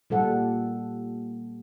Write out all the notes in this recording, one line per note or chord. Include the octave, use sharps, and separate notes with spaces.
A#2 G3 A4 F#5